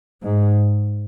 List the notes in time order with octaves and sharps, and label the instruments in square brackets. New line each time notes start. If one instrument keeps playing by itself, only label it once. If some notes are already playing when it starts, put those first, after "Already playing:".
[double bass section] G#2